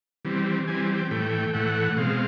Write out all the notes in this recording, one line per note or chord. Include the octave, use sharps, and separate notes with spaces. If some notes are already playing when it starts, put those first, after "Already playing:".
E3 G3 C4
E3 G3 C4 G#5
G5
A2 E3 A3 G5
A2 E3 A3 F#5
B2 G#3 C4 F5